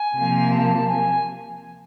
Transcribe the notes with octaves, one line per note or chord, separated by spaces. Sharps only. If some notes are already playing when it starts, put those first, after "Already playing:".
Already playing: G#5
C3 F3 A#3
A5
G#5